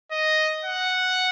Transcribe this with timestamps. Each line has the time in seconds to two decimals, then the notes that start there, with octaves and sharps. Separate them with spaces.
0.11 D#5
0.65 F#5